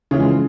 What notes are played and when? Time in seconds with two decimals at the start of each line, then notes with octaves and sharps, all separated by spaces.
0.11 C#3
0.14 E3
0.16 F3
0.19 G#3